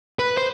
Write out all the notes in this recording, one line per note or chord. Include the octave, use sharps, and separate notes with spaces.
B4
C5